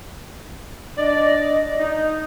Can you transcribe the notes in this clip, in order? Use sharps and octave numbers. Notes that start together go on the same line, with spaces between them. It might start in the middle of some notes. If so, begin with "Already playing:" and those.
D4 D5 D#5
D#4